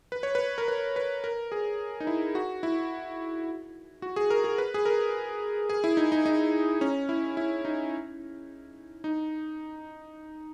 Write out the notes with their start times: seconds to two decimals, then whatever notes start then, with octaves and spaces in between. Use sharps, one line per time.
0.12 B4
0.23 C#5
0.35 B4
0.58 A#4
0.68 B4
0.96 B4
1.24 A#4
1.52 G#4
2.00 D#4
2.07 E4
2.35 F#4
2.63 E4
4.02 F#4
4.16 G#4
4.30 A#4
4.44 G#4
4.58 B4
4.74 G#4
4.85 A#4
5.69 G#4
5.84 E4
5.97 D#4
6.12 D#4
6.26 D#4
6.81 C#4
7.09 E4
7.37 E4
7.65 D#4
9.04 D#4